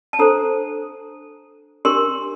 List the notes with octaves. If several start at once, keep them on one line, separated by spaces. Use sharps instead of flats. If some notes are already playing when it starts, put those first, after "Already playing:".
A5
D4 A4 C5 A#5
D4 G4 A#4 C6